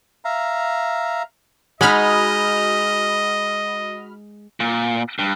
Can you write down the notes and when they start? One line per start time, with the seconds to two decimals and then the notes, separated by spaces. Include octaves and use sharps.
0.25 E5 F5 A#5
1.81 G#3 D#4 F#4 D#5 B5 F6
4.60 A#2
5.19 G2